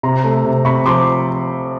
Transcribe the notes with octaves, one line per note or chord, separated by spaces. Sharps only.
C3 A#5 C6
A3
C3
C3 B5 C#6
F3 C6 D6